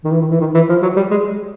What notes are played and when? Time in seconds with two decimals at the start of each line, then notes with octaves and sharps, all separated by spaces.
0.04 D#3
0.11 E3
0.21 D#3
0.31 E3
0.41 D#3
0.55 E3
0.69 F3
0.82 F#3
0.96 G3
1.11 G#3